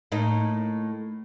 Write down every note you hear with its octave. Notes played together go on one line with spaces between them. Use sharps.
A2 A#3 D#4